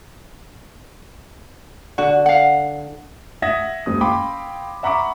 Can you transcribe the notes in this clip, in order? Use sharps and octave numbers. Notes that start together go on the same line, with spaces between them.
D3 F#4
F5 F#5
E5 F#5 D#6 E6 G#6 A#6
F#1 D#2 G#3 D#6
F5 G5 B5 C6 D6
E5 F#5 A#5 B5 C#6 D6